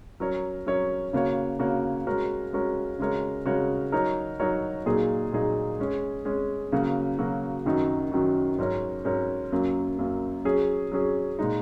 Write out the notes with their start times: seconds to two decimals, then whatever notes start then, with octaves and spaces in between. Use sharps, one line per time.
0.20 F#3 C#4 A#4 C#5
0.66 F#3 C#4 A#4 C#5
1.13 C#3 A#3 F#4 C#5
1.59 C#3 A#3 F#4 C#5
2.07 G#3 C#4 F#4 A#4
2.53 G#3 C#4 F#4 A#4
2.99 C#3 G#3 F#4 A#4 C#5
3.46 C#3 G#3 F#4 A#4 C#5
3.92 F#3 D#4 F#4 A#4 C#5
4.39 F#3 D#4 F#4 A#4 C#5
4.86 A#2 F#3 A#3 D#4 G#4
5.32 A#2 F#3 A#3 D#4 G#4
5.79 G#3 C#4 G#4
6.25 G#3 C#4 G#4
6.72 C#3 F#3 A#3 F#4
7.19 C#3 F#3 A#3 F#4
7.66 F#2 D#3 F#3 D#4 F#4
8.12 F#2 D#3 F#3 D#4 F#4
8.58 G#2 F#3 C#4 A#4 C#5
9.05 G#2 F#3 C#4 A#4 C#5
9.52 F#2 F#3 A#3
9.99 F#2 F#3 A#3
10.45 F#3 C#4 G#4
10.92 F#3 C#4 G#4
11.39 A#2 G#3 D#4